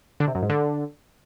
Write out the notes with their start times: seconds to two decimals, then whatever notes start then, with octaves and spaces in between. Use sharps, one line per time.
0.20 D3
0.28 C3
0.35 F#2
0.42 G#2
0.50 D3